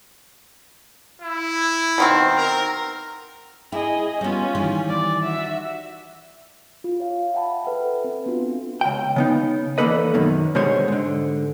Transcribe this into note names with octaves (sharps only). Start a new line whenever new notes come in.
E4
B2 D#3 C4
A#4
E4 G#4 D#5
G3 B3 C#4 F4
D#3 E3 G3
D5
F#4 E5
F4
C#5 F5
E5 F#5 G5 A5 B5
A4 B4 E5 F#5 B5
C4 B4
B3 D4 F4 F#4 A4
C#2 G5
C#3 B3 D#4
E2 G3 A#3 A4 B4 D#5
F#2 B2 D#3
B2 D3 G3 G#3 C5 C#5
G#2 D3